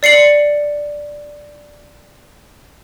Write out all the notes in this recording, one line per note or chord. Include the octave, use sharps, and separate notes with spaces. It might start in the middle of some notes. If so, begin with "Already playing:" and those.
D5 C7 C#7 F#7